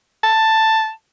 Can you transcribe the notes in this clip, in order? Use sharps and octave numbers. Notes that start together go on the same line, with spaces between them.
A5